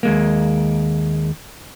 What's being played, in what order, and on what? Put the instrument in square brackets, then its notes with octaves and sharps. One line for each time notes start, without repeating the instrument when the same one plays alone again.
[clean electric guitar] D#2 G#3 A#3